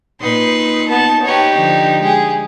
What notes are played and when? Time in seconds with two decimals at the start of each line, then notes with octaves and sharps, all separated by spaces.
0.21 A#2 D#4 B4 C6
0.88 B3 A5
1.24 D#4 G4 B4 C#5
1.57 D3 F3
2.01 G#3 G4 G#4